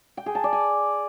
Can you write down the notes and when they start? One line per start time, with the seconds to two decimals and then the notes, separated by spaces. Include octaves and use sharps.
0.17 G5
0.26 G#4
0.35 A5
0.44 D5
0.53 G#5